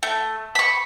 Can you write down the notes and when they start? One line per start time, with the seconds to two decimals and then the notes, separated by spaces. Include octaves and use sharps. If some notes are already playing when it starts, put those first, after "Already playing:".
0.03 A3
0.55 B5 C#6